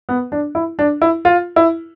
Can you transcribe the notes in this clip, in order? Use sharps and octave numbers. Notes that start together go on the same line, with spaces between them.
B3
D4
E4
D4
E4
F4
E4